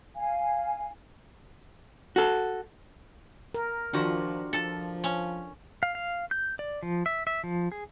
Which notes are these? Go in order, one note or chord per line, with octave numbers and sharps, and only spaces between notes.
F5 G#5
F#4 A4
A#4
D#3 F3 D4 F4 F#4
F3 A4
C#4
F5
F5
G6
D5
F3
E5
E5
F3
G#4